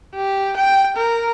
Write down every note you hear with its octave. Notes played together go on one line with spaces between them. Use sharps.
G4
G5
A#4